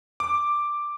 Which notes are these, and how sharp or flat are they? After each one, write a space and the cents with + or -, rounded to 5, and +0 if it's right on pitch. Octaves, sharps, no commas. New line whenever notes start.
D6 +5